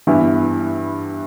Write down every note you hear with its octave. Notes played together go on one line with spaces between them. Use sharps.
G2 E3 B3 E4